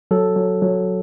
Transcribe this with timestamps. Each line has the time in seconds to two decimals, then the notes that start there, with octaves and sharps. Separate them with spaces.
0.11 F#3 A4
0.37 F#3
0.62 F#3